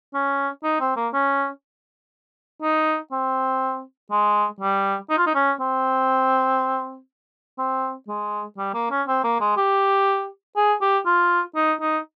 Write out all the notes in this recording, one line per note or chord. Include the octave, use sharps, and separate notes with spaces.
C#4
D#4
C4
A#3
C#4
D#4
C4
G#3
G3
D#4
F4
D#4
C#4
C4
C4
G#3
G3
A#3
C#4
C4
A#3
G#3
G4
G#4
G4
F4
D#4
D#4